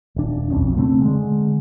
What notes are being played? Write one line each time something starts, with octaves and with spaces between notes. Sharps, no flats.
D#1 D4
E1 B1 F2 C#4
C#3 A3 C4
D3 G#3